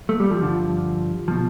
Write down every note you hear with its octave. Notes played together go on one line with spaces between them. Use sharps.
A3
G3
F3
G2 D3 F3
B2 F3